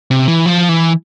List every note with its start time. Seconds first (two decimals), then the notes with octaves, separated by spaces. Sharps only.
0.11 C3
0.28 E3
0.46 F3
0.69 E3